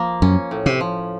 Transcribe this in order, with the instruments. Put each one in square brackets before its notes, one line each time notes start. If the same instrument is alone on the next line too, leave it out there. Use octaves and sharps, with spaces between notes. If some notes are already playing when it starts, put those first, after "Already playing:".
Already playing: [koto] F3 A#3
[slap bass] F#2 [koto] C#4
[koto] A2
[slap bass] C3
[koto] F3